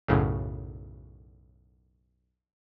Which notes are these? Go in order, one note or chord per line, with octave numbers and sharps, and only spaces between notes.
B1 F#2 A2 C#3